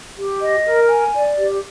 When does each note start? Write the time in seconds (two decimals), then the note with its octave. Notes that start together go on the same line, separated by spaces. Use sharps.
0.16 G4
0.40 D#5
0.65 A#4
0.89 G#5
1.13 D5
1.38 G4